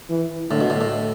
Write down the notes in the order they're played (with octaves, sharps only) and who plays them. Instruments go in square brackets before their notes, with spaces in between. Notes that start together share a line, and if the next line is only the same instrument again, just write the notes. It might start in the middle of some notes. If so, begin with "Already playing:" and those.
[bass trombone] E3
[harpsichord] A2 [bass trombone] D3
[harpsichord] B2
A2
A2